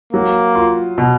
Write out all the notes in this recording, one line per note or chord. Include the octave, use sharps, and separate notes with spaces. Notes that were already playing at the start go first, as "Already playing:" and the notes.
F#3 A#3
F4
B2